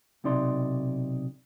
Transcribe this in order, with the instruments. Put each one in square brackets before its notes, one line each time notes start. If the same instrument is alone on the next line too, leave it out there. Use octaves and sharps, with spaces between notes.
[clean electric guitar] B1 C3 D#4 D5 C6